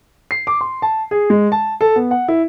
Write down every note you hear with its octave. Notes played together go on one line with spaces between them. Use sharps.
C7
D6
C6
A5
G#4
G#3
A5
A4
B3
F#5
E4